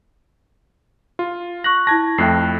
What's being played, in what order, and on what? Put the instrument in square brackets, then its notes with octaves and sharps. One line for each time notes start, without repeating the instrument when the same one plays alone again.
[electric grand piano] F4
[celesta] C#6 F#6 F#7 [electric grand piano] A#6
[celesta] E4 A5 [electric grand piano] G#6 A#6
[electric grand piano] F2 A3 E4 [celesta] G5 F#6 C7